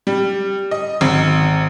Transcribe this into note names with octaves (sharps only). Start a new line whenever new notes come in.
G3
D#5
G#1